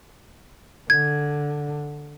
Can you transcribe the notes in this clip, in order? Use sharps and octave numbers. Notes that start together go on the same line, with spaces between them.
D3 G#6